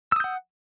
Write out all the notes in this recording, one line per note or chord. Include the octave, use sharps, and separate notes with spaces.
F#5 D#6 E6 G6